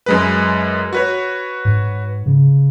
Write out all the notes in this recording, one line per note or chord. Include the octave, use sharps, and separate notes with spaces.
F#2 G#3 B4
F#4 B4 C#5
G#2
C#3